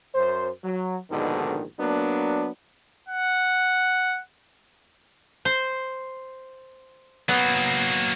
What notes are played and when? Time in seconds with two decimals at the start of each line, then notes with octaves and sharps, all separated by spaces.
0.15 F#2 C5
0.63 F#3
1.11 A#1 G#2 B2 D3 D#3
1.78 F#3 A#3 B3 D4
3.09 F#5
5.45 C5
7.29 F#3 A#3 B3